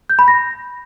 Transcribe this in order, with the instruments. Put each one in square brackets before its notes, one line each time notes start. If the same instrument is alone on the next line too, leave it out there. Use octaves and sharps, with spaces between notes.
[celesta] G6
B5
A#6